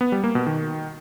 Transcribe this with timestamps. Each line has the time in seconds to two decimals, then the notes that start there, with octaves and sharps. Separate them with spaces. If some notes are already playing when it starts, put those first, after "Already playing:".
0.01 B3
0.12 G3
0.24 A#3
0.35 B2
0.47 D#3